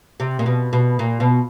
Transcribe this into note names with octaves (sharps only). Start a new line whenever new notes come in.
C3
A#2
B2
B2
A#2
B2